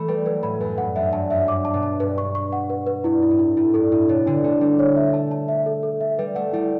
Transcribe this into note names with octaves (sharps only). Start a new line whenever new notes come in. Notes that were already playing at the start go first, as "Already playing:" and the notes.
Already playing: E3 A3 B5
G3 B4
F#3 B4
A2 B5
F#2 B4
G2 F#5
F#2 E5
G2 A5
F#2 E5
G2 D6
A5
B2
A5
G2 B4
C#6
C#6
F#5
B4
B4
G2 E4
E4
A2
E4
A2 E4
G2 A4
A2 E4
B2 C#5
D3 D4
A3 D4
G3 D4
C#5
E5
A3 A5
A5
E5
A4
A4
E5
G3 B4
A3 F#5
G3 E4